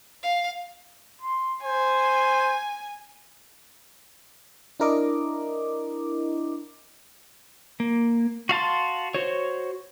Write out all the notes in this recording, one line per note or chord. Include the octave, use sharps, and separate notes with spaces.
F5
C6
C5 G#5
D4 E4 A#4 D#5 D6
A#3
F#4 F5 A5 C6
F#4 C5 C#5